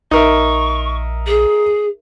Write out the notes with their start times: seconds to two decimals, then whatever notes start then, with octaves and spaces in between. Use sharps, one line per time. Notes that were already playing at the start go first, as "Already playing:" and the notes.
0.11 A#1 D#4 A#4 E5 C#6
1.26 G#4